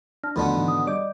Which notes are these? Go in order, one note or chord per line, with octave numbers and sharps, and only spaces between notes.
D4 A5 F6
D#2 B2 D3 F3 A3 B3 B5 C6
G#2 D#3 E3
D#6
G3 D5 D#5 D6 G6